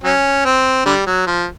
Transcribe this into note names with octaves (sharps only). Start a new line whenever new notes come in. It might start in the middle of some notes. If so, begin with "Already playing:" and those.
F#3 C#4
C4
D3 G3
F#3
F3